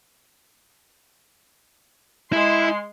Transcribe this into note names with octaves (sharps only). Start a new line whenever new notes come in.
G#3 E4 C6